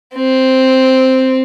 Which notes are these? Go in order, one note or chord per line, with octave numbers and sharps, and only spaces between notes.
C4